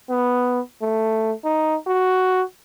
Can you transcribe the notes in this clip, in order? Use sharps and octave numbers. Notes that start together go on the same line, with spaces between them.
B3
A3
D#4
F#4